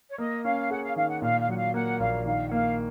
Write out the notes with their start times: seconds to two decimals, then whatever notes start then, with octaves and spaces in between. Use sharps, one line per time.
0.10 C#5
0.18 A#3 D#5
0.45 C#4 F5
0.70 G#4 F#5
0.84 F5
0.96 D#3 F5
1.09 F#5
1.22 A#2 F5
1.40 F5
1.48 F#3 F#5
1.57 F5
1.74 A#3 F#5
2.00 A#1 F5
2.25 D#3 F5
2.47 F#5
2.51 A#3 F5